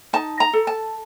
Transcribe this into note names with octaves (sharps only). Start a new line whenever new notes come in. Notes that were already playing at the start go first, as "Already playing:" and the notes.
D#4 A5
A#5
A4
A5